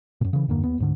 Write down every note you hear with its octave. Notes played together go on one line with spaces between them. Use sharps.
F#2 A#2
C#3 E3
E2 G2 D3 A#3
D#2 B3
D2 G#2 D3